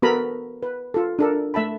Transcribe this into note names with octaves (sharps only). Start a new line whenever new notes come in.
B3 F#4 A4 A#4 A#5 B5
B4
F4 A4
D4 A4 A#4
A3 E5 A5 B5